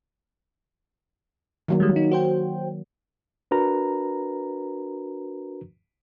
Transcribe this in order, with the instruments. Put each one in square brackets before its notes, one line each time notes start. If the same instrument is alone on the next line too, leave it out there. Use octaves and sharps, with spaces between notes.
[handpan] D#3 F#3 A#3
[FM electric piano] G3 G#3
D#4
F#4 C5 G5
[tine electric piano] D4 F#4 A#4 B4 A#5